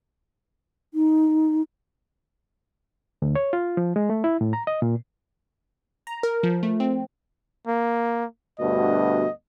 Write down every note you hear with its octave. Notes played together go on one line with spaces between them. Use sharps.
D#4
D2
C#5
F4
F3
G#3
A3
E4
A2
A#5
D#5
A#2
A#5
A#4
F3
A3
C4
A#3
D2 G2 B2 D#5